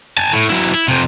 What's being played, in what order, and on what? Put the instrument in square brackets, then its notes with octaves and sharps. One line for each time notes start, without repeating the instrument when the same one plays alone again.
[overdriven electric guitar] G#5 A5
A2
F#3 E4
E4
F2 C3